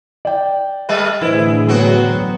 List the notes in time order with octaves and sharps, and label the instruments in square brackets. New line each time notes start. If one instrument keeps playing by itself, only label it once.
[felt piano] D5 G5
[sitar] G3 A3 B4
[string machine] A2 D3 G#4 [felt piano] E3 B4 C5 [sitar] E4
[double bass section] F#3 B3 [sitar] C4 F#4